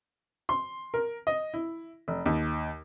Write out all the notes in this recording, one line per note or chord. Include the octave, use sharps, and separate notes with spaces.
C6
A#4
D#5
E4
F1
D#2